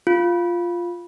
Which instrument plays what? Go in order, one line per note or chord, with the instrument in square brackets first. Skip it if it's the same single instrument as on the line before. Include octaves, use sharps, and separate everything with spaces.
[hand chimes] F4